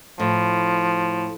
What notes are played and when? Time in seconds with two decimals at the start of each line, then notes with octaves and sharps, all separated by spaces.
0.20 A2 F3